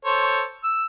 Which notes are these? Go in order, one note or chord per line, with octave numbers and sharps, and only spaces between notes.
A4 C5 C#5
E6